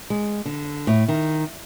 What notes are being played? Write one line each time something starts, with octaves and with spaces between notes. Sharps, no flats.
G#3
D3
A2
D#3